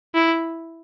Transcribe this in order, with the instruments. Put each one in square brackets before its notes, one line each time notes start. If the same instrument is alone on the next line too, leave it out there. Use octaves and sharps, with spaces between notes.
[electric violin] E4